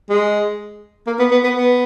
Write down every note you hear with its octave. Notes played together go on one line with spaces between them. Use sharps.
G#3
A#3
B3
B3
B3
B3